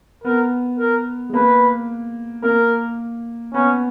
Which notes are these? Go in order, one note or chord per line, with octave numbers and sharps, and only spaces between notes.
B3 A#4
A#4
G#3
A#3 B4
A#3 A#4
B3 C#4